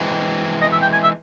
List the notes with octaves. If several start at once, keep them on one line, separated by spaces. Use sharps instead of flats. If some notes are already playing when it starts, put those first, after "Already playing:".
Already playing: E3 G#3 C4
D#5
E5
G5
G#5
E5